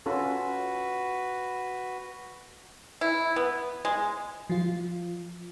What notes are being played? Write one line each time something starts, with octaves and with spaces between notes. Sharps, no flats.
C#4 F4 F#4 A4 B4
E4
B3
G#3
F3 F4